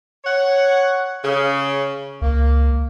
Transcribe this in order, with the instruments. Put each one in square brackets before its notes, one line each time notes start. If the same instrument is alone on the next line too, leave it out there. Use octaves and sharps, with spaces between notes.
[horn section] C#5 F#5
C#3
[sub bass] C#2 [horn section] A#3